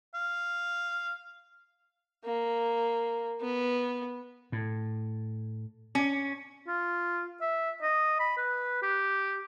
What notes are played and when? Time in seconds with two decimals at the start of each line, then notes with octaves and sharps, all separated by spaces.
0.15 F5
2.24 A#3
3.41 B3
4.52 A2
5.95 C#4
6.68 F4
7.41 E5
7.83 D#5
8.20 B5
8.37 B4
8.83 G4